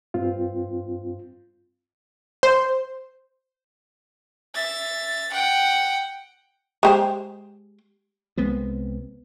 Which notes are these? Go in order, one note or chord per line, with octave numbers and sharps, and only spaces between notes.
G2 C4 F4
C5
E5 A6
F#5 G5
G#3 G4 C5
C2 G#3 B3 C4